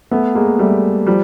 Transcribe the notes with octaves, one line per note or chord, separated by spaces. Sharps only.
A3 B3
G#3 A#3
G3 A3
F3 G3